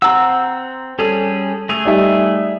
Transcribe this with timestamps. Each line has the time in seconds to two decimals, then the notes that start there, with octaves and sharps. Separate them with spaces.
0.02 C4 F#5 A#5 E6
0.99 G3 C#4 G#4 A4
1.69 A3 G#4 F7
1.85 G3 D#4 E5